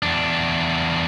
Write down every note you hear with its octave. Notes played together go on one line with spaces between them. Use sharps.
E2 D4